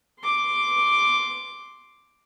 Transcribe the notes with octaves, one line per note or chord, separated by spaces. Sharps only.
C6 D6